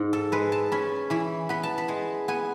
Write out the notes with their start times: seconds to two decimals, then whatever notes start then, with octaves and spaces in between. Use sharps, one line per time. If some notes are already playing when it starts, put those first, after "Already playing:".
Already playing: G#2
0.13 A4
0.32 G#3 B4
0.52 A5
0.72 C#4 B5
1.10 E3 B5
1.49 B3 B5
1.63 A5
1.78 B5
1.88 G#3
2.28 B3 G#5